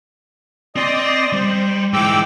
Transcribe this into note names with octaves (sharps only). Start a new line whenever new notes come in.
C4 D5 D#5 C6 D#6
G3 C5
G#2 E3 G5 D6 E6